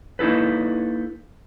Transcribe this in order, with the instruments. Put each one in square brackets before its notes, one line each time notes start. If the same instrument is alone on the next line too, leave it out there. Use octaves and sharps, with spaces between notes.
[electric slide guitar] A#3 D#4 E4 A4 B4